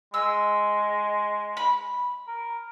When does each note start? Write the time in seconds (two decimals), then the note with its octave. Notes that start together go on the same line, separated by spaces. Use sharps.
0.14 G#3 E6
1.57 B5
2.27 A#4